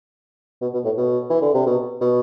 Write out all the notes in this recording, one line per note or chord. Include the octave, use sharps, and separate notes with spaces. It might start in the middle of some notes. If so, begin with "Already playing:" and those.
B2
B2
A2
B2
E3
D3
C3
B2
B2